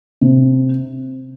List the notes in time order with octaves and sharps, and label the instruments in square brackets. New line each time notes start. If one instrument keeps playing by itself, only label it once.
[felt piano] C3